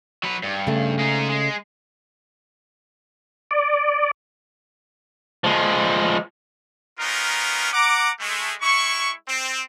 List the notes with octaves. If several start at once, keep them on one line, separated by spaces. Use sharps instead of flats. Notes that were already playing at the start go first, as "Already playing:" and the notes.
F#3 B4
G2
C#3 A3
G#3 D#4
G#3
D5
F3 G#3
B3 C#4 D#4 F4 A#4
F#5 A#5 D6
G#3 A3
G#3 E4 C#6
C4